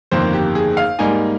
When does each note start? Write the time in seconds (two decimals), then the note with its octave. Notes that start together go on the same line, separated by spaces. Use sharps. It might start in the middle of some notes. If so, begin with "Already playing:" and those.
0.11 G1 F2 D#3 A#3 C5
0.33 G4
0.55 G#4
0.77 F5
0.99 G#2 G3 A#3 D#4 G#5